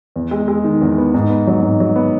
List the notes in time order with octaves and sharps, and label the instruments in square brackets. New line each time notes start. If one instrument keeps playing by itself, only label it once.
[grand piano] E2
G#3
G#3
D#3
E2
B3
G#2
B3
F#3
G#2
F#3
B3